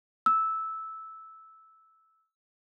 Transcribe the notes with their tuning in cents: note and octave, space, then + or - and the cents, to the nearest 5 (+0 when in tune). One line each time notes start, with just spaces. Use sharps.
E6 -10